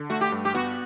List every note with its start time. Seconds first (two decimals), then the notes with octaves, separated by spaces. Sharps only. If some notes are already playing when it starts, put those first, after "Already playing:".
Already playing: D3
0.10 A3 F#4
0.21 G4
0.32 G2
0.45 G4
0.54 B3 F#4